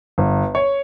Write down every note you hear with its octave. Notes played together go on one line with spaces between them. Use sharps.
G1
C#5